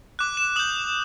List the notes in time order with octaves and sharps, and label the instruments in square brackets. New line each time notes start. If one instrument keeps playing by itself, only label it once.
[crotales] D6 F#6
E7
D#6 G6 F#7